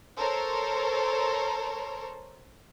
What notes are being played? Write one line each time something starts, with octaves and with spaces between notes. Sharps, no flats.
A4 A#4 C5 C#5